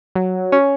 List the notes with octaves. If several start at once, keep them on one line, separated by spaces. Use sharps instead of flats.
F#3
C#4